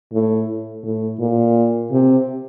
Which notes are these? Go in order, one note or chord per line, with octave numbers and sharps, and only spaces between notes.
A2
A2
A#2
C3